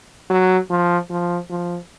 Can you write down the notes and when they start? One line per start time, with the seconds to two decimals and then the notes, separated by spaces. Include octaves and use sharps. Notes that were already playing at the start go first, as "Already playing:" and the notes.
0.30 F#3
0.70 F3
1.10 F3
1.50 F3